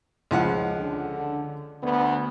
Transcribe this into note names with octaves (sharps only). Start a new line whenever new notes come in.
C#2 F3 F#5
D3
D2 B3